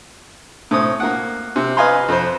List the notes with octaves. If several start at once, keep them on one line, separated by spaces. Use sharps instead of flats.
A2 C4 D#6
A#3 F#5
C3
B4 D#5 F5 G#5 A#5 C6
F2 C5